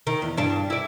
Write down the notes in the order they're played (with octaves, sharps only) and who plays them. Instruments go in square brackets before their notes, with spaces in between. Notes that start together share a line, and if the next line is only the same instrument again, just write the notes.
[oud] D#3
E2
G2 D4
E4 D5